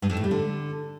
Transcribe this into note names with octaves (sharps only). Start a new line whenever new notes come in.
G2
F2
A2
G3
D3